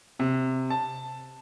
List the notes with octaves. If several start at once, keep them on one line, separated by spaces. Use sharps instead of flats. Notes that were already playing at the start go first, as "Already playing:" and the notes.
C3
A5